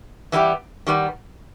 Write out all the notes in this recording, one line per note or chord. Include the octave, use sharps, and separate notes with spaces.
E3 G3 B3 D#4 G4
D#3 G3 B3